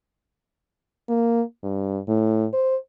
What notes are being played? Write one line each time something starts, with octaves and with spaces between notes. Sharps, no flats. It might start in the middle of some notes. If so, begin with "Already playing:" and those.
A#3
G2
A2
C5